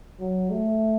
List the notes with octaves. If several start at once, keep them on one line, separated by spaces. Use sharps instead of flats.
F#3
A3